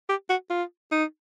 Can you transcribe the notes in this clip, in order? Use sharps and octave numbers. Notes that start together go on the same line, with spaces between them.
G4
F#4
F4
D#4